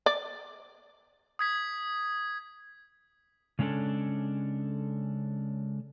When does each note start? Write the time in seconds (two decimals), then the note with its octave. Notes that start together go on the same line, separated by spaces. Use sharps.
0.06 D5
1.39 D#6 G#6 B6
3.59 C#3 G#3 C#4 D4 A4